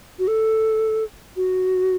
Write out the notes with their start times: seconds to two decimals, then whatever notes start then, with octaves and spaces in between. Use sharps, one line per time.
0.19 F#4
0.28 A4
1.36 F#4